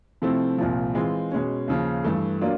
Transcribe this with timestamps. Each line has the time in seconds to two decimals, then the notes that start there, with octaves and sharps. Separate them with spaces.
0.22 C3 F3 A3 C4 E4
0.58 C2 A#2 F3
0.95 E3 G#3 C4 F4
1.32 B2 G#3 C#4
1.68 D#2 C#3 F3
2.04 G2 E3 A3
2.41 F#3 A#3 D4 F4